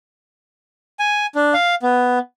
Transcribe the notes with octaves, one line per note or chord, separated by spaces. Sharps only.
G#5
D4
F5
B3